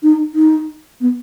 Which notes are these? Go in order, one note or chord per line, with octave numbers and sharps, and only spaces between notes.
D#4
D#4
B3